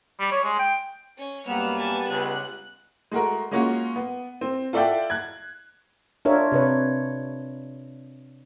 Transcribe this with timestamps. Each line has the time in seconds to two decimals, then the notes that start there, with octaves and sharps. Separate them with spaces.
0.20 G3
0.32 C#5
0.44 G#3
0.59 G5
1.17 C#4 C#5
1.47 F#2 G3 A#3 B3 B4 E6 F6
1.77 G#5 A5
2.09 C#2 F#6
3.12 G#3 A3 F#4 A#4
3.51 G#3 A#3 C#4 F4 F#4
3.96 B3
4.41 C4
4.73 F4 A4 D5 E5 F#5 G5
5.10 F#6 G#6
6.25 D4 F4 A#4 C#5 E5
6.52 C3 B4 C#5